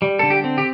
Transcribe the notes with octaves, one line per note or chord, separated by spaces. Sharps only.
G3
D3 A4
G4
C4
G4